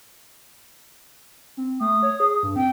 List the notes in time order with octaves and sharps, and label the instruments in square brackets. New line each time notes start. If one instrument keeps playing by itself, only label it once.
[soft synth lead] C4
[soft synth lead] A3 [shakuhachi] D#6
[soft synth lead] C#5
G#4
G2
[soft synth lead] C4 [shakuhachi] G5